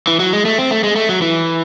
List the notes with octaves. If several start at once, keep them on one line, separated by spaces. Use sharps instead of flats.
E3
F#3
G#3
A3
C4
A3
G#3
A3
F#3
E3